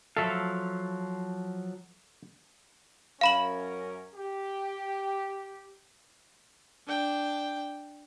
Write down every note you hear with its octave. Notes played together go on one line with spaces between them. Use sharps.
F3 F#3 A4 E5 F5
F#2 C#4 A#4 F5 B5 F#7
G4
D4 G5